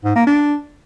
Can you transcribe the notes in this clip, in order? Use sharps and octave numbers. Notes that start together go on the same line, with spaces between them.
G#2
A#3
D4